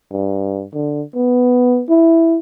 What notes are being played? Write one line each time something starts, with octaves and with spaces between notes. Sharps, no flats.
G2
D3
B3
E4